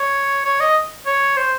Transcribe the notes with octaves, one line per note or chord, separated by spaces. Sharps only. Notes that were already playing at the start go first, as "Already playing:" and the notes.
Already playing: C#5
C#5
D#5
C#5
C5